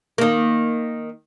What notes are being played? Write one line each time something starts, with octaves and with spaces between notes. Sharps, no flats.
D#3 A#3